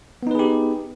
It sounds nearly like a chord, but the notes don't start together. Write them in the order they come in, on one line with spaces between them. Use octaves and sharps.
B3 D#4 B4 G#4 G4